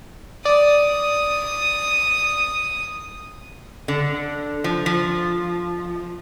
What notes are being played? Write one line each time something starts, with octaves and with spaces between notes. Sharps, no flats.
D5 D#6
D3
F3
F3